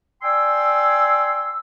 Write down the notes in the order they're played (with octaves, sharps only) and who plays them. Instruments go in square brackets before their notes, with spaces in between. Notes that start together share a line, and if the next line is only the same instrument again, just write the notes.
[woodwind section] D5 G5 G#5 C6 E6